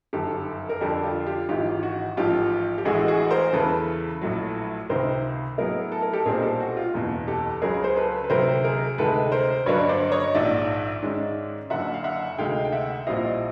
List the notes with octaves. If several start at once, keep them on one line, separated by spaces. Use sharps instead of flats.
G1 F#2 D#3 G4 A4
A#4
F2 D3 G3 G4 A4
F4 G4
F4 G4
G#1 G#2 E3 F4 G4
F#4
A1 G#2 F3 F4 G4
G4
A1 A2 E3 G#3 F#4 G#4
F#4 G#4
A#4 C5
E2 C#3 E3 A4 B4
A#1 A2 F#3
C#2 C3 D#3 A#4 C5
A2 F#3 B3 E4 G#4 A#4
A4
A#4
G4 A4
B1 A#2 G3 C4 G#4 A#4
G4 A4
F#4
F4 G4
F#1 E2 B2
G4 A4
C#2 C#3 F#3 A#3 C#4 G#4 A#4
C5
A4 B4
B4
D2 C3 D#3 F#3 A#3 A#4 C5
G#4 A#4
D2 C3 D#3 G#3 A4 B4
A#4 C5
G2 D3 F#3 A#3 D4 B4 C#5
C5 D5
C#5 D#5
A#1 G#2 D#3 D5 E5
G#2 D#3 G#3 C#4
F#1 F#2 D3 E5 F#5
F5
E5 F#5
D2 C3 D#3 G#3 F5 G5
G5
E5 F#5
A#1 A#2 G3 C4 E4 D#5 F5